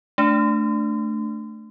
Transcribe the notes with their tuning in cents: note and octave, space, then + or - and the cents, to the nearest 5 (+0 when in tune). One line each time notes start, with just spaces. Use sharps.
A3 +0 D4 +0